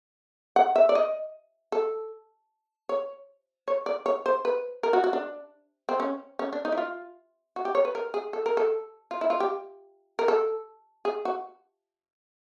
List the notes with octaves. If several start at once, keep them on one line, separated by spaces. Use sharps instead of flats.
F#5
E5
D5
D#5
A4
C#5
C#5
D5
C#5
C5
B4
A#4
F#4
F#4
D4
C4
C#4
C#4
D4
D#4
E4
F4
F#4
G4
C#5
B4
A#4
G#4
A4
A#4
A4
F4
E4
F4
G4
A#4
A4
G#4
F#4